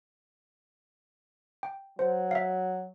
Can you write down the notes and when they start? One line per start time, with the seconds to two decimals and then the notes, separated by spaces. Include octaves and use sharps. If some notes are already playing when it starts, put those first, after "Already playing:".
1.63 G5
1.99 F#3 C5
2.31 E5 F5